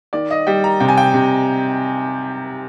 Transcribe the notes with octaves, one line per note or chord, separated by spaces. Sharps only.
D#3 D5
D#5
G3 G5
A#5
C3 G5
G#5
G5
C3